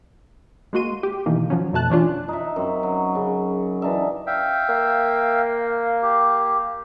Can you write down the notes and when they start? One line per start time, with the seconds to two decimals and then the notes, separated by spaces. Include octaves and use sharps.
0.73 G#3 A#3 F#4 C6 D#7
1.03 G4
1.26 B2 D#3 E3 A#3
1.50 F3 F#3 C#4
1.73 F2 B2 A3 A5 F#6
1.90 E3 C#4 D4 F4
2.28 D#4 E5
2.56 F#2 C4
2.83 F#3
3.15 C#3
3.82 E3 D4 D#4 E5
4.27 E5 F5 G5
4.69 A#3
6.02 G4